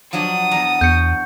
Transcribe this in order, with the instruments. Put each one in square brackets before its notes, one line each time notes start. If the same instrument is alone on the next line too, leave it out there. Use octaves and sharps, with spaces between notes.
[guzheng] F3 F#3 D4 [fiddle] D#6
[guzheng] E2 D5 A#5
[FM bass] E2 [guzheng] F#4 [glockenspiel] G6 C#7